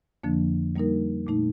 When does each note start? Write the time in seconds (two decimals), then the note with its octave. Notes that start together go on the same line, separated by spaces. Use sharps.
0.24 F2 D3 F3 A#3 D4
0.76 G3 A#3 D#4 A#4
1.27 A#2 A3 D#4